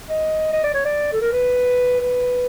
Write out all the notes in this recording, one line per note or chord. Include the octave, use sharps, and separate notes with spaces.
D#5
D#5
D5
C#5
D5
A4
A#4
B4
B4